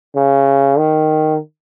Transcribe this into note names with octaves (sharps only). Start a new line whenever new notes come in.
C#3
D#3